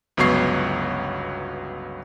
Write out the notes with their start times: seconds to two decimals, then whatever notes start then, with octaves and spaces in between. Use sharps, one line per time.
0.17 G1 C#2 F#3 B3 C#6 C7